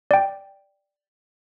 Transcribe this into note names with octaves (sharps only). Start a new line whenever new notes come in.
D5 G5